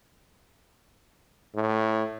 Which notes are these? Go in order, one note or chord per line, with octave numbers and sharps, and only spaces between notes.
A2